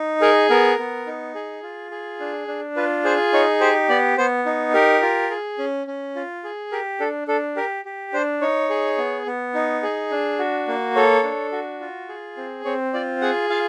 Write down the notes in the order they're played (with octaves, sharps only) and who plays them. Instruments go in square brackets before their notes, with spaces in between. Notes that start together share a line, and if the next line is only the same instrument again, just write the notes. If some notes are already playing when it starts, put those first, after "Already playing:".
Already playing: [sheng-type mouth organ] D#4
G#4 A#4
B3 A#4
B3
D#4
G#4
F4
G#4
D4
D4
F4 B4
G#4 C5
D#4 C#5
G4 C5
B3 D5
B3 C5
D#4
G4 A#4
F4
G#4
C#4
C#4
F4
G#4
G4 A#4
D4 A4
D4 A4
G4 A#4
G4
D4 C5
D#4 C#5
G#4
B3
B3
D#4
G#4
D4
F#4
A#3
A4 C#5
D4
F#4
F4
G#4
C4
C4 C#5
F4 D5
G#4 F#5
F4 F5